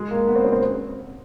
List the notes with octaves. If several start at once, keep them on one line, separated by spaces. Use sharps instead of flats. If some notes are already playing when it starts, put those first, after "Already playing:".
Already playing: G#3 G#4
A#3 A#4
B3 B4
C4 C5
C#4 C#5
C4 C5